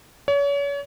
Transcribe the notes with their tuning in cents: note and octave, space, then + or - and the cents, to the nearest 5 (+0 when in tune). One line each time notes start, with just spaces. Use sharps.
C#5 +35